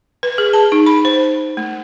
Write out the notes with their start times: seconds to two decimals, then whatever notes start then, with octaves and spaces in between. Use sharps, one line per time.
0.23 B4
0.38 G#4
0.53 A5
0.72 D#4
0.86 B5
1.05 C5
1.57 A3